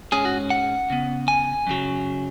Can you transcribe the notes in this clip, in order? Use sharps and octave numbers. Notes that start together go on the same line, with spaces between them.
G#2 G#3 C#4 G#4
F#4
F#5
C#3 B3
G#5
F#2 C#3 F#3